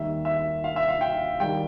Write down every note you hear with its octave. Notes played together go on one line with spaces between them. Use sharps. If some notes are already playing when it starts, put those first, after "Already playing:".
Already playing: D#2 D#3 G3 E5
E5
F5
E5
F5
G5
D#3 G3 G5